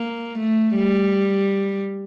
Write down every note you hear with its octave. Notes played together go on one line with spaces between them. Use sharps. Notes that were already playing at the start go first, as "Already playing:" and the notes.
Already playing: A#3
A3
G3